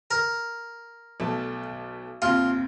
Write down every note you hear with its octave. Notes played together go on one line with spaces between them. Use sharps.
A#4
B1 A3 A5
D#2 C3 F4